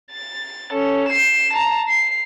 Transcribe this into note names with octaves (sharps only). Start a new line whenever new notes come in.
A6
C#4 A4
C7 E7
A5 A#5
C7